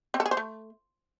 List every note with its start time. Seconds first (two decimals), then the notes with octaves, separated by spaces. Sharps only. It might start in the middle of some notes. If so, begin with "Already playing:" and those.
0.14 C4
0.20 A4
0.26 G#4
0.31 C5
0.37 A3